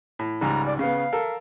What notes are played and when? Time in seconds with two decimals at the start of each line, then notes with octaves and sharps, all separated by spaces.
0.19 A2
0.41 C#2 G#2 G3 A#5
0.66 D5
0.79 C#3 B3 F5
1.13 A4 A#4